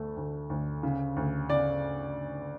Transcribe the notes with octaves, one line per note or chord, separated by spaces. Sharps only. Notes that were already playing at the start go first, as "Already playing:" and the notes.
Already playing: D2 A3
D2
D2
C#3
D2
C#3 D5